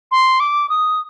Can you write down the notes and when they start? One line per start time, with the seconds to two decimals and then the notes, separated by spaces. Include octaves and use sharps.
0.11 C6
0.40 D6
0.69 D#6